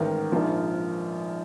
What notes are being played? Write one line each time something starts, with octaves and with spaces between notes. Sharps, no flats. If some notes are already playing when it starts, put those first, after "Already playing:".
Already playing: A1 G#2 D#3 A#4
A#1 G#2 F3